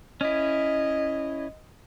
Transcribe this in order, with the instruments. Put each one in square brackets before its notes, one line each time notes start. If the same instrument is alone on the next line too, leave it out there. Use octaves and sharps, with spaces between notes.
[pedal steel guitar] C#4 E4 [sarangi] D#5